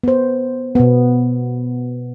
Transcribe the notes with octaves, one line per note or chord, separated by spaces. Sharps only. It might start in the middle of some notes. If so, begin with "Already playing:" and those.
B3 C5
B2 B3